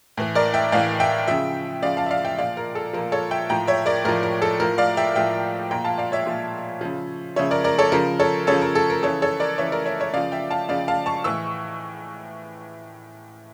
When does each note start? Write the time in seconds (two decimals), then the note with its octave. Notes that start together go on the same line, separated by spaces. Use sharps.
0.17 A2 E3
0.35 A#4 D5
0.54 E5 G5
0.72 A2 E3 D5 F5
1.00 E5 G5
1.27 C#3 F3 E5 G5
1.83 C#3 F3 D5 F5
1.97 F5 A5
2.06 E5
2.11 D5 F5
2.25 E5 G5
2.38 A#2 F3 D5 F5
2.57 A#4
2.75 A4
2.93 A#2 F3 A#4
3.12 A4 C#5
3.31 E5 G5
3.49 A2 F3 G5 A#5
3.67 C#5 E5
3.86 A#4 D5
4.04 A2 F3 A#4
4.23 A#4
4.42 A4
4.59 A2 F3 A#4
4.78 D5 F5
4.97 E5 G5
5.15 A2 F3 E5 G5
5.71 A#2 F3 G5 A#5
5.84 F5 A5
5.98 D5 F5
6.12 C#5 E5
6.26 A#2 F3
6.81 C#3 F3
7.36 C#3 F3 C#5 E5
7.51 A#4 D5
7.64 A#4 D5
7.78 A4 C#5
7.92 C#3 F3 A#4
8.20 A4 C#5
8.47 C#3 F3 A4 C#5
8.62 A#4
8.75 A4
8.90 A#4
9.03 C#3 E3 A4 C#5
9.22 A4 C#5
9.40 A#4 D5
9.58 C#3 E3 C#5 E5
9.72 A#4 D5
9.86 C#5 E5
10.00 C#5 E5
10.14 C#3 F3 D5 F5
10.32 E5 G5
10.51 F5 A5
10.69 C#3 F3 D5 F5
10.88 F5 A5
11.06 A5 C#6
11.24 A2 E3 C#6 E6